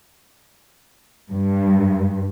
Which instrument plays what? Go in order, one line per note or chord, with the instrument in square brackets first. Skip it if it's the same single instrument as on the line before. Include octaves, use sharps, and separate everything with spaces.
[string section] G2